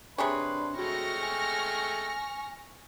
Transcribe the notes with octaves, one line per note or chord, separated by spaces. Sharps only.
C3 D4 G#4 B4 C#5 C6
G#3 A3 F#4 G5 C#6 F6 A#6
G#5